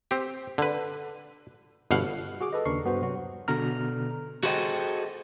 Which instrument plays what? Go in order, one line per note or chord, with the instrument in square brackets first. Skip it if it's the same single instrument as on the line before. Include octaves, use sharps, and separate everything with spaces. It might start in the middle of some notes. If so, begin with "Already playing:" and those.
[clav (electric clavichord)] C4 G4
D3 B4
G1 B2 F5 F#5
[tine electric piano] F#4 G#4 D6
A4 B4 D#5
D#2 C#3 D4 A#4 C#6 C7
G2 B3 F#4 C5
C3 F#3 F#4
B2 D3 A#5 F6
[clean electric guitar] F#4 G#4 A4 C5 D#5 G5